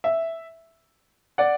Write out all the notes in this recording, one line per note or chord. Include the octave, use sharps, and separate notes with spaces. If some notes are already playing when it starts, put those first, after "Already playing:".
E5
D5 F#5